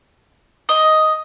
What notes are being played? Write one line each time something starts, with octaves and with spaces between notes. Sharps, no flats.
D#5